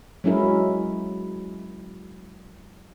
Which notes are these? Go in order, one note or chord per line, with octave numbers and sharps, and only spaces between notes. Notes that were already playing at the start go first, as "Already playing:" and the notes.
F#3 G#3 C#4 E4 A#4